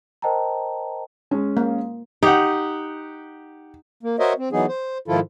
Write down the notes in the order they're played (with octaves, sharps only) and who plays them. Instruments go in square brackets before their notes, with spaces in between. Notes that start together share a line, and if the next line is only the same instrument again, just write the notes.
[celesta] A#4 C5 D#5 G5 A5 A#5
[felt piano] G#3 C#4
[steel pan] A#3
[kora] D#4 [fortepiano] G4 F#5
[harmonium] A#3
F#4 A#4 C5 C#5 D#5 E5
C4
E3 F#3 B3 D#4 G#4
C5
G#2 D#3 F3 E4 F4 A4